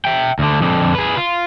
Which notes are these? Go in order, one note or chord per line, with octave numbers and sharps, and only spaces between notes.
E5 G5
D2 D3
F2 D3
G#4 B4
F4